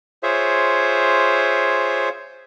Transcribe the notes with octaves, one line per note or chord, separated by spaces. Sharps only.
F4 G#4 C5 C#5 E5